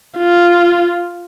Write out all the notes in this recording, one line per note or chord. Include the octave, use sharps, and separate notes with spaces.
F4